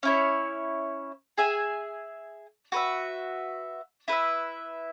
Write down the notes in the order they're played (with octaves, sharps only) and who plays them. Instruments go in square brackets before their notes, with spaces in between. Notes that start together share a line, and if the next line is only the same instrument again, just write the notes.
[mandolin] C#4 E4 C#5
G#4 E5 G#5
F#4 B4 E5
E4 B4 E5